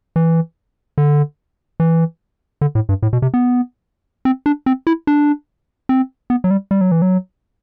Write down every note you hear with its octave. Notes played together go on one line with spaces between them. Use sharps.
E3
D3
E3
D3
A2
G2
A2
B2
C3
B3
C4
D4
C4
E4
D4
C4
B3
F#3
G3
G3
F#3
E3
F#3